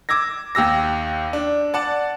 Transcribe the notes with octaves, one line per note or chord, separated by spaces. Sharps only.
D6 E6 G#6 A#6
D#2 G4 E6 A#6
D4
D5 F#5 A5